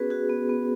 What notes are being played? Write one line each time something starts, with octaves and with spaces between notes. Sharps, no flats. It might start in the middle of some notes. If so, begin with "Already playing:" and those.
Already playing: B3 C#4 F#4 G#4 B4
F#4 G#4
B3
B3